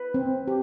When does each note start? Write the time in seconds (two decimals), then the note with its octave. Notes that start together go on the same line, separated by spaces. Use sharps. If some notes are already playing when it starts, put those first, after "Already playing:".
Already playing: B4
0.14 C4
0.48 G4